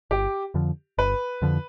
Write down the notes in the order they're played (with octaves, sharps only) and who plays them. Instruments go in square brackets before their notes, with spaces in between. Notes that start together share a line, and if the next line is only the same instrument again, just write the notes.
[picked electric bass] G1 [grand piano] G4
[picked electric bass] F2 D3 F3
[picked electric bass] G1 [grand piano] B4
[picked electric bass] F2 D3 F3